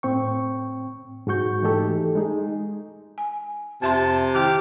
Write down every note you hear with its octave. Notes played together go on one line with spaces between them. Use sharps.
A2 C4 G5 C#6
G#2 G#3 F#4 C#6 G6
E3 A3 D#4 G4 A4
G#3 D#4 G#4
G#5
F2 C3 E5 A5 C6
D#3 E4 G4 D6 F6